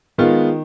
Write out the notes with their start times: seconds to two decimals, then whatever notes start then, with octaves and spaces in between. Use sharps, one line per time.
0.18 D#3 G#3 B3 F4